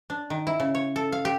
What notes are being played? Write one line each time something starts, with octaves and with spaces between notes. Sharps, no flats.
D4
D#3
E4
C#3
C#5
A4
F5
G4